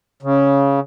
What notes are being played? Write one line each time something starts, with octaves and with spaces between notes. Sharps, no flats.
C#3